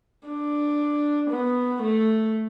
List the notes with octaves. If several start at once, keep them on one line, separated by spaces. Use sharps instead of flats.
D4
B3
A3